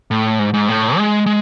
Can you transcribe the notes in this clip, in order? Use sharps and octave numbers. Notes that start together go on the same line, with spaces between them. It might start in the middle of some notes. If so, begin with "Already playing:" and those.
A2
G#2
G#2
A2
G#3
G#3